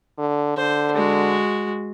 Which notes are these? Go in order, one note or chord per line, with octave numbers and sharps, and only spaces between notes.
D3
D3 C5
G#3 F#4